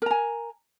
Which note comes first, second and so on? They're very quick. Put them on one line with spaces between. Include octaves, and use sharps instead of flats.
A#4 A#5 G#5